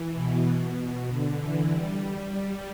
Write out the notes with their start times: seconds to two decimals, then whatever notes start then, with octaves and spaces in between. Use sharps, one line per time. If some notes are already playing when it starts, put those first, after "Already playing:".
Already playing: E3
0.14 B2
1.07 D3
1.39 E3
1.70 G3
2.32 G3